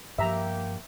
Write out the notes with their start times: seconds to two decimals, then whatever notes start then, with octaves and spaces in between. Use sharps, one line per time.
0.19 G2 F3 A#3 G4 E5 A#5